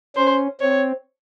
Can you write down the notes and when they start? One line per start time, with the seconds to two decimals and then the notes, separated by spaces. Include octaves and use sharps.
0.16 C#4 C5
0.61 C4 C#5